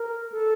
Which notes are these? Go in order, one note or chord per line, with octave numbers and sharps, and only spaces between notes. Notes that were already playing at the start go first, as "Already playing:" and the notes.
Already playing: A#4
A4